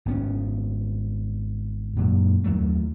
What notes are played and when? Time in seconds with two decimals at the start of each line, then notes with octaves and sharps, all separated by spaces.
0.06 G#1 B3 C#4
1.96 F#2 A#2 F#3
2.44 D#2 F#3 A3